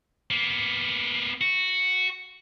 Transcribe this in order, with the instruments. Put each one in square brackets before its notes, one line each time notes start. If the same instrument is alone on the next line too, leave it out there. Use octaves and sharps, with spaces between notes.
[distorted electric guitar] A#3 B3
F#4